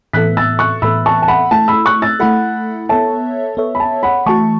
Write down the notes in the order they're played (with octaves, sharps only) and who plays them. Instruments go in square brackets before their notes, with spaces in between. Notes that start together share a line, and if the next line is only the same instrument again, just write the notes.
[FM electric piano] A2 E3 B3 A4 E5 [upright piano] F#6 B6
[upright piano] E6 A6
C#6 F#6
[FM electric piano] A2 E3 B3 A4 E5 [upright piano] B5 E6
[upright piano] A5 C#6
A5
F#5 B5
[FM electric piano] A3 E4 A4 [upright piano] A5
[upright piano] B5 E6
C#6 F#6
E6 A6
[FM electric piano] A3 E4 A4 [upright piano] F#5 B5
[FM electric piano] B3 A4 C#5 E5 [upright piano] A5
[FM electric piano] B3 A4 C#5 E5
[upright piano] B5
A5
F#5 B5
[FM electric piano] E3 A3 F#4 [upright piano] A5 C#6